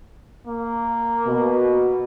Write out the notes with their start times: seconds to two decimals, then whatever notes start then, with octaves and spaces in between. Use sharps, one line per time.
0.47 A#3
1.26 B2